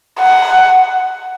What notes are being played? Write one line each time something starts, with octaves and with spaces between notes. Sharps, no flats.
F#5